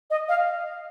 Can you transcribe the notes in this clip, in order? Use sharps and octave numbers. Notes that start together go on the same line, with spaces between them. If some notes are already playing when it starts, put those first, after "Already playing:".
D#5
F5